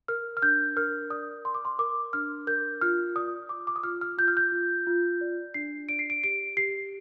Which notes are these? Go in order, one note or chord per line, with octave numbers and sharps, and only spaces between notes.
A#4 F6
F6
D4 G6
A#4 F6
D5 D#6
D5 C6
D6
C6
A#4 D6
D4 F6
A#4 G6
F4 F6
D5 D#6
F4 D6
D6
D#6
F4 F6
F6
F4 G6
F6
G6
F4
F4
D5
D4 C7
D5 D7
C7
D7
G4 D7
G4 C7